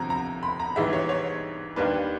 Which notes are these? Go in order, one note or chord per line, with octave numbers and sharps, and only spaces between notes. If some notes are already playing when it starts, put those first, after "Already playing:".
Already playing: D2 C3 F3 A#5
A#5
B5
A#5
A#1 G#2 E3 G3 E5
C#5
C#5
D#2 D#3 G3 A#3 D4 B4